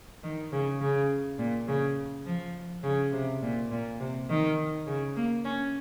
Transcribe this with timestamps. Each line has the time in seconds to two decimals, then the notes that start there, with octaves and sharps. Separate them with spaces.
0.23 D#3
0.52 C#3
0.81 C#3
1.38 A#2
1.68 C#3
2.26 F3
2.83 C#3
3.12 C3
3.42 A#2
3.71 A#2
4.00 C3
4.29 D#3
4.87 C#3
5.16 A#3
5.45 C#4